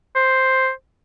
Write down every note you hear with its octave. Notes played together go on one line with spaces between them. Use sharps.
C5